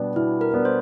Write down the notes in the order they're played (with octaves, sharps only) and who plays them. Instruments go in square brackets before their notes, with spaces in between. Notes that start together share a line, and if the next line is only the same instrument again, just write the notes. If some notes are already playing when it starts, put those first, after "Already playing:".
Already playing: [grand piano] B2 G3 B3 D4
[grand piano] B2 [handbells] E4
[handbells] A#4
[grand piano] G3 B3 D4
[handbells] C5